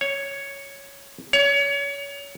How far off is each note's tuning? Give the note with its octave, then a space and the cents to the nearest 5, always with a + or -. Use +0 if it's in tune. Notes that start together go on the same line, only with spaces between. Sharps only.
C#5 +0
C#5 +25